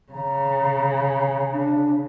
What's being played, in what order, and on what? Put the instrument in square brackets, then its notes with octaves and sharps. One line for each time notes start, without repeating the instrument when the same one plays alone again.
[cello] C#3 [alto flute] A#5
[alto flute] D4